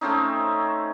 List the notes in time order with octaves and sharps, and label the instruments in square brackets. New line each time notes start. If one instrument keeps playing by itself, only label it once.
[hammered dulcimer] A3 C4 C#4 D#4